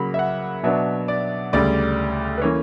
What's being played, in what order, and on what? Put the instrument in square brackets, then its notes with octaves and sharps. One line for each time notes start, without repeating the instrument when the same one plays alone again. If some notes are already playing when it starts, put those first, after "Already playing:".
Already playing: [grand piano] C#3 F#3 A#3 B5
E5
F#5
B2 F#3 B3 D4 E5
D5
D2 C#3 G3 D5
B4
E3 A#3 C#4 C#5